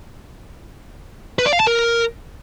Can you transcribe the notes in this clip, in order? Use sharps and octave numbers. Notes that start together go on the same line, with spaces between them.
B4
D5
F5
A5
A#4